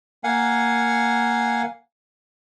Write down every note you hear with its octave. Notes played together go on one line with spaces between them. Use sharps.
A#3 F5 F#5 G#5